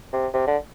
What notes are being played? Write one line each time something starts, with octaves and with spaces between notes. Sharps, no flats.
C3
C3
D3